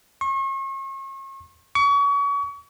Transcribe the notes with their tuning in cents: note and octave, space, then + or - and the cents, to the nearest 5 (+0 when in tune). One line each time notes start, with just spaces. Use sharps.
C#6 -40
C#6 +35